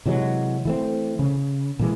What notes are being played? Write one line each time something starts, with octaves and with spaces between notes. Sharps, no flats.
C3 E3 F#3 G#3
E3 A3 C4
C#3
A#2 E3 G#3